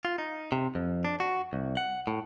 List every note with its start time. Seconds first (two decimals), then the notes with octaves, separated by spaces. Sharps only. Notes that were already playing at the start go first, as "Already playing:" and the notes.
0.05 F4
0.18 D#4
0.52 C3
0.75 F2
1.05 D4
1.20 F#4
1.53 C2
1.77 F#5
2.07 A2